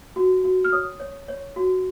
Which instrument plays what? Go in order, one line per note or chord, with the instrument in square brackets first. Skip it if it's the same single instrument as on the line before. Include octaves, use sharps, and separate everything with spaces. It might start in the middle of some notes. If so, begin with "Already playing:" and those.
[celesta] F#4
F#4
F6
C#5 D#6
C#5
C#5
F#4